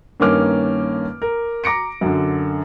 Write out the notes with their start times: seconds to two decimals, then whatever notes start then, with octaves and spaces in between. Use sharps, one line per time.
0.20 G2 D#3 A#3 C#4 D6 F6
1.22 A#4
1.64 A#5 D6 A#6 C#7 D7
2.01 F#2 D3